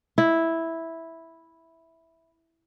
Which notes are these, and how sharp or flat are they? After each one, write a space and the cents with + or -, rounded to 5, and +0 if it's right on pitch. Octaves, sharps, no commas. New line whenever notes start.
E4 -5